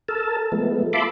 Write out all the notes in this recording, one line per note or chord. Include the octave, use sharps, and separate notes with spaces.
A4 A#4 A5
F3 G#3 A3 B3
F4 E5 A5 B5 C6 D6